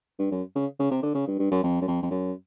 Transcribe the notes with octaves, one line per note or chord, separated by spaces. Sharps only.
G2
F#2
C#3
C#3
C3
D3
C#3
G2
G2
F#2
F2
F#2
F2
F2
F#2